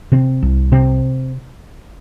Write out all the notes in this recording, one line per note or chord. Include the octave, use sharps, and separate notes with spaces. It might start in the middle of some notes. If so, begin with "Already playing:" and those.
C3 C4
C2
C3 C4